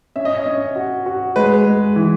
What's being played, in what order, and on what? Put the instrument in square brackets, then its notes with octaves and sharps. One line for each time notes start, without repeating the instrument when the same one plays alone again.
[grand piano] C#4 [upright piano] E5
[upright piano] D#5
C#5
[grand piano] C#4 [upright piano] D#5
[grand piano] F#4
F#4
[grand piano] G#3 [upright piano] B4
[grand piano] G#3
E3